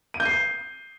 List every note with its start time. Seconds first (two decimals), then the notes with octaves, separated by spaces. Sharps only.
0.14 D#7
0.20 G6
0.26 C7